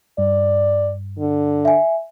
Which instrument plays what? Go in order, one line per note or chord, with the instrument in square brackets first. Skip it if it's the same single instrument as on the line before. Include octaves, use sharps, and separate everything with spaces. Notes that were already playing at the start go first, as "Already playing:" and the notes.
[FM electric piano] G2 [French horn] D5
[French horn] D3
[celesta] E5 G#5